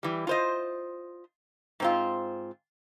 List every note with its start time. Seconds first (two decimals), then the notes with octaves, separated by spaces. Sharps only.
0.03 E3 G3
0.27 F4 C5 D#5
1.80 G#2 C4 F4